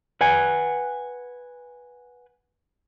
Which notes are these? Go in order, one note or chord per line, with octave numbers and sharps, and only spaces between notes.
B4 F#5 G#5